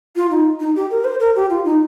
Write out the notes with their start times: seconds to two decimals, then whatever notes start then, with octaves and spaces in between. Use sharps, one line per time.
0.16 F4
0.31 D#4
0.60 D#4
0.76 G4
0.91 A#4
1.04 C5
1.20 A#4
1.36 G4
1.50 F4
1.65 D#4